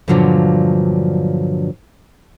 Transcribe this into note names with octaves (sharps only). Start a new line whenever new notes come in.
G2 A#2 D3 F3 F#3